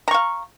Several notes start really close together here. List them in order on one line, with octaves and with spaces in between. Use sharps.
A#5 C#6 F5